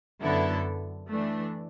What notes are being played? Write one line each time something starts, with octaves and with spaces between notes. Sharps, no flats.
F#2 D3 B3 E4 A4
E3 A3 D4